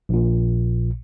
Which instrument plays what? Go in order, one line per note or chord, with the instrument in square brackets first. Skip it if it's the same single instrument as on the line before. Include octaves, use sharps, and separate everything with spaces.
[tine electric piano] A#1 A#2